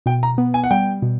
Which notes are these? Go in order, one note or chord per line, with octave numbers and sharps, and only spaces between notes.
B2 G5
A#5
B3
G#5
F#5
G3 G5
B2